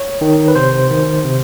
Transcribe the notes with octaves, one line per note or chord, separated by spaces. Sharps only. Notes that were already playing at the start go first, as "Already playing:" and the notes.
Already playing: C#5
D#3
B4
C3 C5
D#3
C3